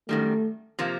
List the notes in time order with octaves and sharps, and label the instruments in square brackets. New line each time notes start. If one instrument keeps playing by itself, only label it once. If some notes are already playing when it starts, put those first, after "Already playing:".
[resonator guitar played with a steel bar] F#2 D#3 G3 [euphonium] A3
[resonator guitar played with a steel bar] C3 F3 A#3